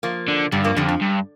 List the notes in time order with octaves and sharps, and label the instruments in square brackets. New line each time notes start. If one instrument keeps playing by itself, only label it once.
[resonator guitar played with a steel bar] F3 A#3
[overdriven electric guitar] D3
[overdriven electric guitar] G2 [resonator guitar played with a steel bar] D3 G3
[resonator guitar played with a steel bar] F3 A#3
[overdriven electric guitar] F2 [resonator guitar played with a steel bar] D3 G3
[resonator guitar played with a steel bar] F3
[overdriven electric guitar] G2